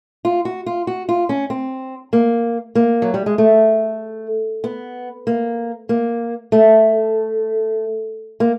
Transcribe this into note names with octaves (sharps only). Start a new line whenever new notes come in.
F4
F#4
F4
F#4
F4
C#4
C4
A#3
A#3
F#3
G3
G#3
A3
B3
A#3
A#3
A3
A#3